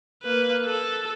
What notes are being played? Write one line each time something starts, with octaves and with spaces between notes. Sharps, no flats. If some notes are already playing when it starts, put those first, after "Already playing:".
A#3 B4
A4